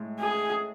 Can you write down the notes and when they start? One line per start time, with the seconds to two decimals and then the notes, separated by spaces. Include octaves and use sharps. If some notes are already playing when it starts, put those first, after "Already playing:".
Already playing: A2 G#3
0.20 G#4